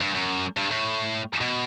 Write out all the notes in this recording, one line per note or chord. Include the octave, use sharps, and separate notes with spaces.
G2
F#2
G2
A2
B2